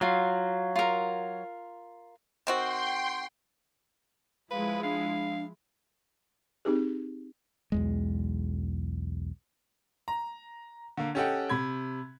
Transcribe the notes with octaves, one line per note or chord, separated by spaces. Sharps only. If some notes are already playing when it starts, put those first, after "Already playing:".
F#3 F4 F5
F4 A#4
D#3 C4 F#4 G5 C6
F3 G#3 E4 B4 F5
D4 F5
C4 D#4 G4 G#4
B1 E2 G#3
A#5
D3 A#3
C#4 G4 A4 D#5 F#5 G5
C3 B5 G#6